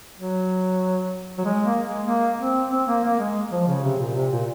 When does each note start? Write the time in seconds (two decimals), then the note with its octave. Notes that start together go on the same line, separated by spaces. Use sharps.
0.18 F#3
1.38 F#3
1.45 G#3
1.66 A#3
1.87 G#3
2.08 A#3
2.40 C4
2.71 C4
2.88 A#3
3.04 A#3
3.19 G#3
3.51 F3
3.67 C#3
3.84 C3
3.99 A#2
4.15 C3
4.31 A#2